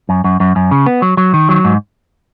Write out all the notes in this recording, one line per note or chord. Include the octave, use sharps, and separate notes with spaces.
F#2
F#2
F#2
F#2
C#3
B3
F#3
F#3
D#3
F#3
G#2